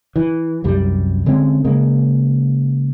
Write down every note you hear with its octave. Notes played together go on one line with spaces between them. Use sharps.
E3
C2 F#2 G3
D3 G#3 C4 C#4
C#3 G#3 A#3